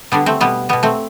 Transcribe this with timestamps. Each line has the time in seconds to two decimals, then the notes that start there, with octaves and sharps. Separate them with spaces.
0.12 D3 G3 B3 D4
0.26 A3 C4
0.41 B2 G3 B3
0.69 B2 G3 B3
0.83 A3 C4